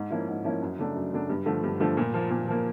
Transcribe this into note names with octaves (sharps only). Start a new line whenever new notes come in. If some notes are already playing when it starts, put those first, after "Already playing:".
Already playing: G#2
F3 A#3 C#4 E4
G#2
F3 A#3 C#4 E4
F#2
C#3 F#3 A3 D4
F#2
C#3 F#3 A3 D4
G2
D3 F3 A3
G2
D3 F3 A3
A#2
F3 A#3
A#2
F3 A#3